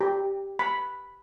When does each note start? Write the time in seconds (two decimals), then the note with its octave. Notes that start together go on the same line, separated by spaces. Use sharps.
0.01 G4
0.59 B5